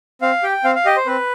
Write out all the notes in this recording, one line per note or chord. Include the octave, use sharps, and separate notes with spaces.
C4 F5
G4 G5
C4 F5
F5
G4 D#5
C5
C4 B4